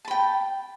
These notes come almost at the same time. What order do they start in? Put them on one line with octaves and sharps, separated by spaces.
A5 B5 G5